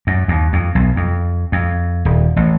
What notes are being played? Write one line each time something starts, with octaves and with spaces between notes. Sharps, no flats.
F#2
D#2
F2
B1
F2
F2
D#1
A1